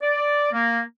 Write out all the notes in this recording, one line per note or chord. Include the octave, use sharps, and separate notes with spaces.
D5
A#3